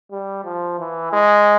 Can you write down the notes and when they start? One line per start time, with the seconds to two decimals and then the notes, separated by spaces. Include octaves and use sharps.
0.11 G3
0.44 F3
0.79 E3
1.13 G#3